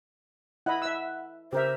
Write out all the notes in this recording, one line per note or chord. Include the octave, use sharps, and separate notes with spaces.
E4 D#5 F#5 B5 F#6
E5 E6
C#3 G4 A#4 C5 E5